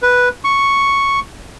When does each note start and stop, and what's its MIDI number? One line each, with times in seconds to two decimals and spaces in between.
0.02 0.29 71
0.44 1.20 85